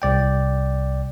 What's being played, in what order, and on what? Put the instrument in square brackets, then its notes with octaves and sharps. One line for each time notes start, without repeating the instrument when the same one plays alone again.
[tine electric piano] C2 D5 G5